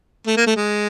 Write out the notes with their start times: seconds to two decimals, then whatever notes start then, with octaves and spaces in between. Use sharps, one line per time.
0.27 A3
0.37 A#3
0.47 A3
0.56 G#3